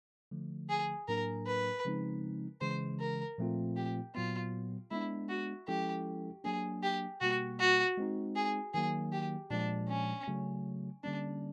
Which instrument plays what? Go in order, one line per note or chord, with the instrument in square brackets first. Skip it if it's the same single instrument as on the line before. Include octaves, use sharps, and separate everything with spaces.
[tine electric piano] D3 F3 A3
[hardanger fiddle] G#4
[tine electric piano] A2 F#3 A#3 D4 [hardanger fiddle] A#4
[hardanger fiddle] B4
[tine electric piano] C#3 F3 G#3 C4 D#4
[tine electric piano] C#3 E3 G#3 [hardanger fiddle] C5
[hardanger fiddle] A#4
[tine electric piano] A#2 F3 A3 C4 F4
[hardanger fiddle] G4
[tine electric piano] A#2 F#3 B3 [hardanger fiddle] F4
[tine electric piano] G#3 B3 D4 [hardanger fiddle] E4
[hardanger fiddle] F#4
[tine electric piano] F3 G#3 C#4 E4 A4 [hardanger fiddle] G4
[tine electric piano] F#3 A#3 D4 [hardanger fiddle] G#4
[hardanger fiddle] G4
[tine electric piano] B2 G3 A#3 [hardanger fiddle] F#4
[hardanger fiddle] F#4
[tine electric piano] G#3 C4 D#4
[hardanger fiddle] G#4
[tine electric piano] D#3 F#3 A#3 [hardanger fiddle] G#4
[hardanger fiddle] G4
[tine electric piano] A#2 F3 G#3 [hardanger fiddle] D4
[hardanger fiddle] C#4
[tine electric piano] C#3 F#3 A3
[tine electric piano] D3 G3 A#3 C#4 [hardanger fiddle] D4